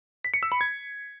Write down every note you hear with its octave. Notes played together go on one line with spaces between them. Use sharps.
B6
C#7
E6
B5
G#6